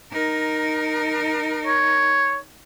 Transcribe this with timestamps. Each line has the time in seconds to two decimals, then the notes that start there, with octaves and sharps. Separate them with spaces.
0.12 D#4 A#4
1.66 C#5